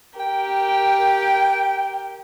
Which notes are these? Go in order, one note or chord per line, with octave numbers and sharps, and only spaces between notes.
G4 A#4 G5